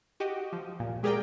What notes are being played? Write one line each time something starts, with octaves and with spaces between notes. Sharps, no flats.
F#4 G4 D#5
F3
A#2
G#3 G4 G#4 A#4 D5 G5